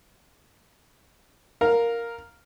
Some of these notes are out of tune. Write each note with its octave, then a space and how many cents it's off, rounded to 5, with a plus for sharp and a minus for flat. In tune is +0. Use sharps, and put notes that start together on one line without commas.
A#4 +0 F5 +10